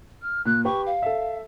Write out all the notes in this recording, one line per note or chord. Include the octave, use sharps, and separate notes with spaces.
F6
A#2 F#6
G4 B4 C#6
F5
A4 E5